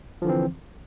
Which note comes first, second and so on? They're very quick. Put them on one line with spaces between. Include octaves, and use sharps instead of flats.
F3 D3 E3 C4